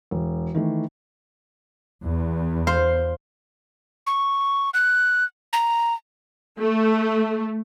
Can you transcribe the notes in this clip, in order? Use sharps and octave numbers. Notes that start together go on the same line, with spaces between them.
E1
D#3 E3 A3
E2
C5 F5 C6
C#6
F#6
A#5
A3